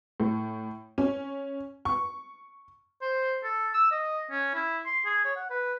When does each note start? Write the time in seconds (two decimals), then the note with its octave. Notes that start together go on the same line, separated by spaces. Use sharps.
0.20 A2
0.98 C#4
1.85 C#6
3.02 C5
3.43 A4
3.74 E6
3.91 D#5
4.31 C#4
4.55 E4
4.86 C6
5.05 G#4
5.25 C#5
5.36 F#5
5.50 B4